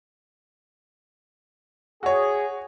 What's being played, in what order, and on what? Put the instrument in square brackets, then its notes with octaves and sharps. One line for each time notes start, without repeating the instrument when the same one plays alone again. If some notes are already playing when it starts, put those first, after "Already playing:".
[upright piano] F#4 C#5 [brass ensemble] G#4